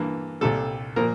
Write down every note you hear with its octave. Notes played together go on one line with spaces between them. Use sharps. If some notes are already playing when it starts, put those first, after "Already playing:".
Already playing: G2 E3 A#3
C2 A#2 G3 A4
A#2 F3 A#3 A#4